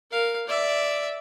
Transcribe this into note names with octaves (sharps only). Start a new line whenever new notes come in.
A#4 F5
D5 E5